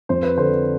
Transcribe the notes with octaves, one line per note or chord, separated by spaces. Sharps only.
F2 C5
B4
D3 C5